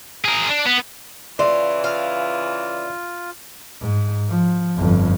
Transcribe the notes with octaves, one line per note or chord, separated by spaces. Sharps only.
G#4 A#4
D4
B3
C#3 E3 F4 D5
F4 F5
G#2
F3
G1 F2